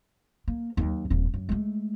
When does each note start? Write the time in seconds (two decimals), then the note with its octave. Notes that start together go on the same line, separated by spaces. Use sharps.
0.48 A#3
0.77 D#2 F#3
1.10 D#1 F2
1.34 F#2
1.49 G#3 A3